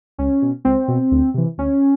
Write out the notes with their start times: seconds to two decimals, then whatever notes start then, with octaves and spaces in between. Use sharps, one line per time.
0.18 C#2 C#4
0.42 B2
0.65 C#2 C4
0.88 B2
1.11 D2
1.34 C3 E3
1.58 D2 C#4